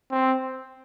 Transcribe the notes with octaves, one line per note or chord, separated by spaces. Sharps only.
C4